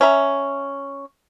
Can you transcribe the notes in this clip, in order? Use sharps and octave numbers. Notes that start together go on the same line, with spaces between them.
C#4 E5 A#5